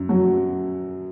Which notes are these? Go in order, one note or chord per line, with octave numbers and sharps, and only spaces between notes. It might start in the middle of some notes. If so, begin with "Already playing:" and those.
Already playing: F#2
F#3